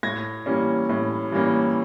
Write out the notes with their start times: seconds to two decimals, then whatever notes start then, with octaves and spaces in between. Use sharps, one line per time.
0.03 A2 G#6 A#6
0.46 E3 G3 A#3 C#4
0.89 A2
1.32 E3 G3 A#3 C#4